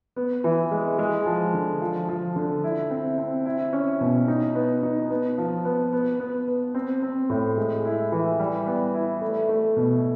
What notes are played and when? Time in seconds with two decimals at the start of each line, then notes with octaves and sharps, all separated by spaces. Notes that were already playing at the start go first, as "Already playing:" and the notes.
0.16 B3
0.44 E3
0.71 G#3
0.99 G#3
1.26 F3
1.53 D3
1.81 F3
2.09 F3
2.36 D3
2.64 E4
2.90 C4
3.18 C4
3.46 E4
3.73 C#4
4.01 B2
4.28 D#4
4.55 B3
4.83 D#4
5.10 B3
5.38 F3
5.65 B3
5.93 B3
6.20 B3
6.48 B3
6.75 C4
7.02 C4
7.30 A2
7.57 G#3
7.85 E4
8.12 E3
8.39 G3
8.67 B3
8.94 E4
9.22 A3
9.49 A3
9.77 B2